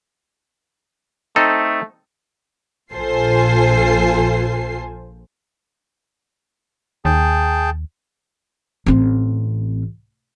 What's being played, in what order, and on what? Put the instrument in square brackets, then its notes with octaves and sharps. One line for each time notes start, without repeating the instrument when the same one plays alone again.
[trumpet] A3 [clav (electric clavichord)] C4 D#4 A4
[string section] A#1 F4 A4 C5 G#5 C7
[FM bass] D#2 [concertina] G#4 G5 A5
[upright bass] A1 C4